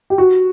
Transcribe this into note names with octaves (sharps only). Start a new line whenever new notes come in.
G4
F#4